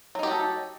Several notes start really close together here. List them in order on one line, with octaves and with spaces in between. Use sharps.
F#3 D#4 G4 F#4 A4